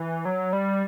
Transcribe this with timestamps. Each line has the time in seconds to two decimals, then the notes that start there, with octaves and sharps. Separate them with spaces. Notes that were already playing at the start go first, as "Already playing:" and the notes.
Already playing: E3
0.25 F#3
0.53 G3